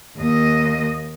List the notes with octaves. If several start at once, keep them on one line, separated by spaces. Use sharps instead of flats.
D#2 D#5